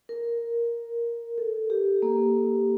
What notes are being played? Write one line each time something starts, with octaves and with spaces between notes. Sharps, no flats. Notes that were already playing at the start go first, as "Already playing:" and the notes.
A#4
A4
G4
A#3